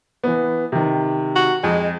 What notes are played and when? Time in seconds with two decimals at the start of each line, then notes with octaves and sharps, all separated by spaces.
0.24 E3 B3
0.72 C3 D#3
1.36 F#4
1.63 F2 G#3